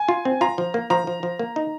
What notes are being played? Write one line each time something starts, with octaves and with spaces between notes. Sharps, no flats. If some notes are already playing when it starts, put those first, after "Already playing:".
Already playing: G#5
F4
C4
F4 A#5
F3
A#3
F3 A#5
F3
F3
A#3
D#4